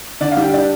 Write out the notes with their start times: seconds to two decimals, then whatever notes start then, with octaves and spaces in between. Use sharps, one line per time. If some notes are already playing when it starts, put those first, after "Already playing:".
0.21 D3 D5
0.31 F5
0.37 G3
0.42 G5
0.53 D4 D5